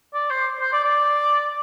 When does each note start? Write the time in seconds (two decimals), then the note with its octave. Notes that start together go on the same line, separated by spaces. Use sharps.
0.14 D5
0.30 C5
0.60 C5
0.73 D5
0.84 D5